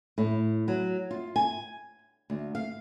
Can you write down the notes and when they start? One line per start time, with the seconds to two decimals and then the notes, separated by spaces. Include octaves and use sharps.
0.18 A2
0.68 F#3
1.11 F4
1.36 G#5
2.30 D2
2.55 F5